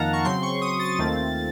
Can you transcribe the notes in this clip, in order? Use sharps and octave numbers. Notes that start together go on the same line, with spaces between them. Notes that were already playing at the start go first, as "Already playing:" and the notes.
Already playing: F2 D#3 A#3 D#4 F5 F#5 A5 A#5
C#6
C#3 F#3 C4 C6
C#6
D#6
A6
D#2 D#3 A3 C4 F4